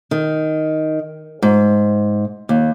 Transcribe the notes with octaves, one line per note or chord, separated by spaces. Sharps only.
D#3
G#2
D#2